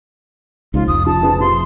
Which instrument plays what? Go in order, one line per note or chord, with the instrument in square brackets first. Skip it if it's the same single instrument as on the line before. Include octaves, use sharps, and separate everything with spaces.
[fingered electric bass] C#2 [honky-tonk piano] F3 C4 D#4 [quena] F4
[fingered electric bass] F1 [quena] D#6
[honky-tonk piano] F3 [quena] A5
[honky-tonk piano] F3 G#4 B4
[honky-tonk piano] C3 [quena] C6